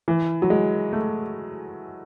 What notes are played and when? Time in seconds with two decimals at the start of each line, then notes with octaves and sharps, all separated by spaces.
0.08 E3
0.42 F#3
0.50 G#3
0.93 A3